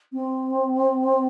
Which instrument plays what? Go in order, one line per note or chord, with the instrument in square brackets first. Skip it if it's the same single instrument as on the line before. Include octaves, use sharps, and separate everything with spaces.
[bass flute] C4